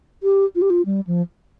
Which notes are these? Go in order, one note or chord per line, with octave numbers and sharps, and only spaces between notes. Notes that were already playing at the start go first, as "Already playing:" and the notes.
G4
F4
G4
F4
G3
F3